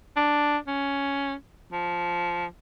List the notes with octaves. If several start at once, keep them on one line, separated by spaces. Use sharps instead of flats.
D4
C#4
F3